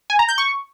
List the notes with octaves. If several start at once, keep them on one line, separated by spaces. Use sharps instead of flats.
G#5
A#5
G6
C#6